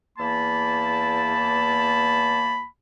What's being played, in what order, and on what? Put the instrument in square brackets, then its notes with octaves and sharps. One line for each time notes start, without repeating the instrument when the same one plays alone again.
[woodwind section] E2 A#3 A5 [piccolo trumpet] B5